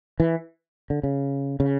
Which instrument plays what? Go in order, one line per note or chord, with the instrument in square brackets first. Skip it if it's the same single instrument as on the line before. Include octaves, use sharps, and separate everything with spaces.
[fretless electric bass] E3
D3
C#3
C#3